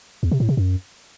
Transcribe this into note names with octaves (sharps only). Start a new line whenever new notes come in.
E2
C3
A2
C3
F#2